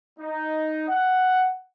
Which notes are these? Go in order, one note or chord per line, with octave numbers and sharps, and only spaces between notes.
D#4
F#5